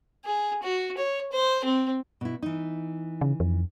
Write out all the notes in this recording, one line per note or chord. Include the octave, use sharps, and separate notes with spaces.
G#4
F#4
C#5
C5
C4
B2 E4
E3 D#4
C#3
F2